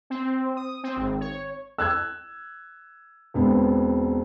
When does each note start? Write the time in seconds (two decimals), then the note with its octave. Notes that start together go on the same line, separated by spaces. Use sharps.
0.10 C4
0.56 D#6
0.83 C4
0.96 G#1
1.20 C#5
1.78 E6 F#6 G#6
3.34 E1 B3 C4